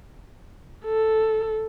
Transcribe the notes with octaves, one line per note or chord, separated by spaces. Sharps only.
A4